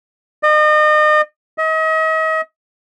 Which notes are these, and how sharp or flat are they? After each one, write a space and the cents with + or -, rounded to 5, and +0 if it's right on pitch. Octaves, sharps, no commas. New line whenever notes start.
D#5 -35
D#5 +40